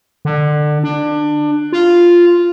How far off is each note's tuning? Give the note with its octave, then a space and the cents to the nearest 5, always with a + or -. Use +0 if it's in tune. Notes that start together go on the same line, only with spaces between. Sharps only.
D3 +25
D4 +20
F4 -5